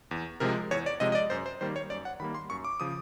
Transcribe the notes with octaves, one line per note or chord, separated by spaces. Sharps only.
E2
C3 F3 G#3 A#4
E2 C#5
D5
C3 F3 G#3 D#5
D#5
D5
F#2 C5
C5
D#3 G3 A#3 C5
C#5
F#2 D5
F#5
D#3 G3 A#3 B5
C6
F#2 C#6
D6
C#3 F3 D#6